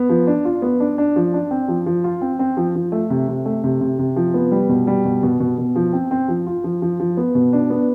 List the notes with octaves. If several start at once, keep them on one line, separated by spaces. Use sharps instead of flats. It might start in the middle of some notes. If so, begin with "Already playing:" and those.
Already playing: B3
F3
D4
F4
B3
D4
D4
F3
D4
C4
F3
F3
F4
C4
C4
F3
F3
A3
C3
C3
A3
C3
C3
C3
F3
B3
G3
B2
G3
B2
B2
B2
B2
F3
C4
C4
F3
F4
F3
F3
F3
B3
B2
D4
B3